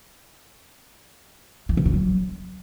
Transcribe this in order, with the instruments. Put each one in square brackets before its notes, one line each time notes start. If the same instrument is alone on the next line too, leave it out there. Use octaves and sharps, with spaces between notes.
[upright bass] E3
C3
A#2
F#3